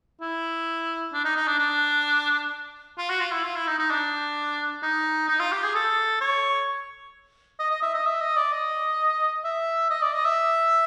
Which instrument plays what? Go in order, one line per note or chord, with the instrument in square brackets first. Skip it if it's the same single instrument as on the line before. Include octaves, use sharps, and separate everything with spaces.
[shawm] E4
D4
D#4
D#4
D4
D4
F4
F#4
F4
E4
F4
E4
D#4
D#4
D4
D#4
D#4
F4
G4
G#4
A4
C#5
D#5
D#5
E5
D#5
E5
D#5
D5
D#5
E5
D#5
D5
D#5
E5